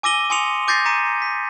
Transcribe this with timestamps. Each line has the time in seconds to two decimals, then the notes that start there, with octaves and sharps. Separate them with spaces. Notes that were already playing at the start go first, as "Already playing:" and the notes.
0.03 G#5 D6 E6 A#6 D#7 G7
0.30 G#5 C6 D#6 C#7 F7
0.68 D6 G6 A6 A#6 C7
0.86 A#5 B6 C#7 D#7
1.22 B6